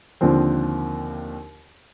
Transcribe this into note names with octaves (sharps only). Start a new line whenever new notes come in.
D#2 D3 F3 C4